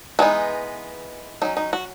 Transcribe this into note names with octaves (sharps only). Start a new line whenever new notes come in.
E3 G#3 B3 D#4 F#4
F#3 C#4 D#4
D#4
F#4